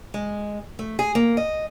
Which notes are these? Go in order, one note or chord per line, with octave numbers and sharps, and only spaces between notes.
G#3
A3
G#4
A#3
D#5